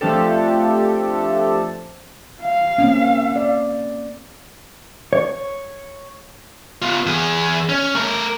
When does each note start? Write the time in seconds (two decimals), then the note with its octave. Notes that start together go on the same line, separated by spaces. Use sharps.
0.01 F3 A3 C4 D4 G4 A4
2.41 F5
2.78 A#3 C4 C#4
3.36 D5
5.13 C#5
6.82 B3 F4
7.06 E2 G#4
7.69 C#4
7.95 A3 A#4